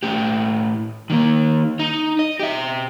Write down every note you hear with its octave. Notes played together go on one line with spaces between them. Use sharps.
A2 G4
D#3 A#3
D#4
D#5
G4 E5